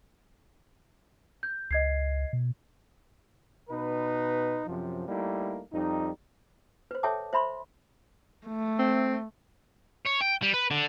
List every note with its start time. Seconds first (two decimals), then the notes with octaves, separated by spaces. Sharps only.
1.43 G6
1.71 C#2 D#5 G#6 C7
2.33 B2
3.69 B2 D#4 B4
4.66 F#2 C3 F3
5.07 G3 A3 A#3 D#4 E4
5.71 F2 G3 D#4
6.91 B4 C5
7.03 A4 C#5 E5 G5 A5 D6
7.33 C5 E5 B5 C6
8.47 A3
8.79 C4
10.05 C#5
10.21 G5
10.42 G3
10.54 B4
10.71 D3